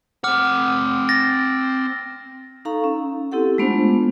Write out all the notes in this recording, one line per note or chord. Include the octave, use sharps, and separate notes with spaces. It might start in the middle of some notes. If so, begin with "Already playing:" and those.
C4 F#5 D6 F6
A6 A#6
D#4 A4 F5 A#5 C#6
C#4
C4 E4 G4 A4 F#5
G#3 A3 B3 D4 F4 C5